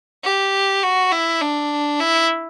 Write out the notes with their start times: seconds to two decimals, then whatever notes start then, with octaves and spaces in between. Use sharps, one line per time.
0.24 G4
0.83 F#4
1.12 E4
1.41 D4
2.00 E4